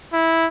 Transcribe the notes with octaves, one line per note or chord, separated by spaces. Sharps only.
E4